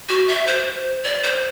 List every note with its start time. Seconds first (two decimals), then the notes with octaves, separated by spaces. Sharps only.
0.09 F#4
0.28 E5
0.47 C5
1.04 D5
1.23 C5